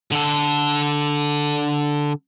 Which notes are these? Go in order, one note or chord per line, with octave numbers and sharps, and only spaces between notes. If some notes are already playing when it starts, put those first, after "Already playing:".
D3 A4